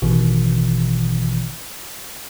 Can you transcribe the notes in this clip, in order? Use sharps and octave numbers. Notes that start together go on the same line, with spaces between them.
A1 B2 D#3 E3